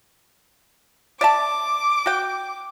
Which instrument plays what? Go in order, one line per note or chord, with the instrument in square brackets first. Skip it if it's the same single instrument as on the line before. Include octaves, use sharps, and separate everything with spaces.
[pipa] D5 E5 A5 [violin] D6
[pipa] F#4 G5